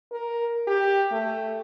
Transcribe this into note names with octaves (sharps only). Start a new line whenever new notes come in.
A#4
G4
A3